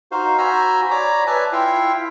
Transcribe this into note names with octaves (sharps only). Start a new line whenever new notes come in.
D#4 F#4 C5 F5
F#4 C5 G#5 A#5 B5 E6
C#5 D5 A#5 B5 D6
B4 D5 E5 G#5 A5
E4 F4 E5 F5 G5